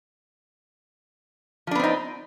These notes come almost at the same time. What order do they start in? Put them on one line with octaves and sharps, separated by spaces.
F3 D4 B3 C4 D#4